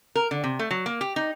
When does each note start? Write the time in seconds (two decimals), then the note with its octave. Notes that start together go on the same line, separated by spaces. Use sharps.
0.15 A#4
0.31 D3
0.44 C3
0.59 A3
0.71 F#3
0.86 A#3
1.01 G4
1.16 D#4